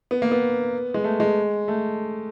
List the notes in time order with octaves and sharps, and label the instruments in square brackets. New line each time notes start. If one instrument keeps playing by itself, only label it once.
[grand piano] B3
A#3
B3
G#3
A3
G#3
A3